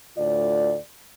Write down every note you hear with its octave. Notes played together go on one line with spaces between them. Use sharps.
D2 A2 F4 D5